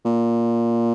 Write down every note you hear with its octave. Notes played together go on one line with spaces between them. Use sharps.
A#2